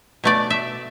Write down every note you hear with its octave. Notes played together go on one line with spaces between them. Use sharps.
B2 A3 D5
E5